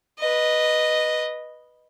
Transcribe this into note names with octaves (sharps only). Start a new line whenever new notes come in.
B4 D#5